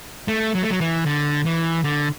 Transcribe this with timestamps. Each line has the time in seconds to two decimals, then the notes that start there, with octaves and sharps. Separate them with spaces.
0.28 A3
0.55 F#3
0.63 A3
0.70 F#3
0.81 E3
1.06 D3
1.45 E3
1.84 D3